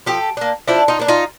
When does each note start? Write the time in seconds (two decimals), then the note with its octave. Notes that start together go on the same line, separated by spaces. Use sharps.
0.06 F3 G4 A4
0.37 A#3 D4
0.68 F3 D4 E4
0.88 D#4 F4
0.99 A#3 D4
1.08 D#4 F4